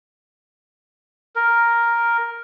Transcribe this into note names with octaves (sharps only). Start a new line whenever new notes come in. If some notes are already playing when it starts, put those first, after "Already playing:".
A#4